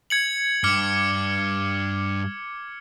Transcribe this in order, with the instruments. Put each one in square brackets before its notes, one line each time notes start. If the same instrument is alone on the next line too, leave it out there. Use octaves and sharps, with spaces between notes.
[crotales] G#6 C#7 F#7
[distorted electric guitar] G2 [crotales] D6 F6 C#7